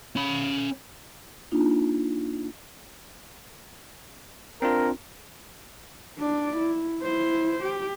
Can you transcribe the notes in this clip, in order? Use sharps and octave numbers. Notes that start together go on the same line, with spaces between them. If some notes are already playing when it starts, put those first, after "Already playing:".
C#4 B5
A#3 D4 D#4 F4
C4 D4 F4 A#4
D4 D5
E4
E4 C5
G4